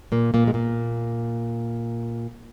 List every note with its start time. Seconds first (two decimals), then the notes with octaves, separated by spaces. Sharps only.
0.12 A#2 A#3
0.34 A#2 A#3
0.48 G#3
0.54 A#2 A#3